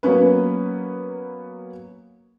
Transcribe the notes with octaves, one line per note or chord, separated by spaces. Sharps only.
F#3 A#3 B3 C#4 B4